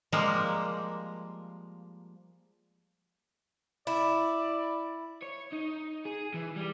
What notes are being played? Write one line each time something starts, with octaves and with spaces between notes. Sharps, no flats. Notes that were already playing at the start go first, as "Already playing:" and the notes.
F3 G3 G#3 A#3
E4 D5
C#5
D#4
G#4
E3
G3